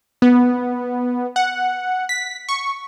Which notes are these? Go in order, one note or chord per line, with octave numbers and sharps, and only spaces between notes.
B3
F#5
B6
C#6